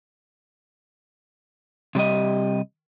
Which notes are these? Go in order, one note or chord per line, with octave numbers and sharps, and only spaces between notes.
C3 G3 G4 D#5